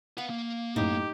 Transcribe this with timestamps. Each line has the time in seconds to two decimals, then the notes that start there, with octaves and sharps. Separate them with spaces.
0.18 B4 F5 F#5
0.30 A#3
0.76 F#2 A2 D#4 G4